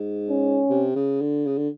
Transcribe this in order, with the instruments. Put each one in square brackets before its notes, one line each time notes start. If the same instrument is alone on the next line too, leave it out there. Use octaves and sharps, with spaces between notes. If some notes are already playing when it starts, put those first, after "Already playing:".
Already playing: [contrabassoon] G#2
[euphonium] C#4
[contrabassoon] C3
C#3
D3
C#3
D3